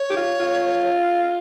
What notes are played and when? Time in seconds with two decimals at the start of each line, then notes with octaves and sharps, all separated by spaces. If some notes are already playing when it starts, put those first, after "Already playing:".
Already playing: C#5
0.10 G4
0.16 F4
0.40 F4